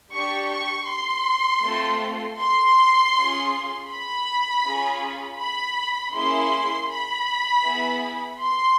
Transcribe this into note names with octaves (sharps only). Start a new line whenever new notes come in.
D4 G4 C#6
C#6
C6
A3 C4 F4 A4
C6
C#4 F4 G#4
B5
C#4 F4 G#4
B5
A#3 C#4 E4 G#4 C6
B5
B3 E4 G#4
C6